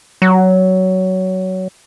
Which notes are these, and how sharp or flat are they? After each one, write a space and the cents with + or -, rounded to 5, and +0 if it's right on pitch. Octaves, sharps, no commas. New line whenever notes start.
F#3 +15